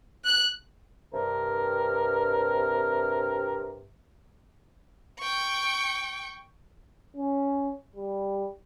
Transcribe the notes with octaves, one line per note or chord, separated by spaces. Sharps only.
F#6
G2 C3 A#4
G5 C#6
C#4
G3